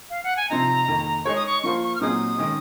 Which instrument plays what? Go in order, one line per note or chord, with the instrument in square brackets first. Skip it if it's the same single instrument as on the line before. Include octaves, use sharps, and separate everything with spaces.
[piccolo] F5
F#5
G#5
[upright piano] C3 F3 C4 D#4 [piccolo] A#5
[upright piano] F2 D#3 A#3
[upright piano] G#3 D#4 G#4 C#5 [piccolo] C#6
[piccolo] D#6
C#6
[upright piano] F3 A#3 F4 C5 [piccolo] C#6
[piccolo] C#6
F6
[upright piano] A#2 F#3 C4 D#4 G#4 [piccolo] D#6
[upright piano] D#3 G#3 C#4